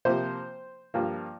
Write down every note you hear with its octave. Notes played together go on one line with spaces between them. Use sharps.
C3 F3 A#3 C5
G2 F3 A#3